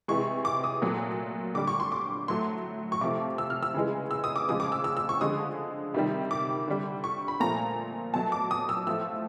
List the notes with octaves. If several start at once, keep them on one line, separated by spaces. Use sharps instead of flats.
C3 E3 G#3 C#6
D6
D#6
A#2 F#3 A3
D3 G3 D6
C#6
C6
D6
A2 F#3 A3 C6
C#6
C3 F3 A3 D6
E6
F6
E6
C#3 E3 G#3
E6
D#6
D6
C#3 F3 G#3 D#6
D6
E6
E6
E6
C#6
D3 F3 G#3 D#6
C3 D#3 G3
D6
D3 G3
C#6
B5
A#2 F3 A3 A#5
B2 F#3 A3 A5
D6
D#6
E6
A2 F3 A3 E6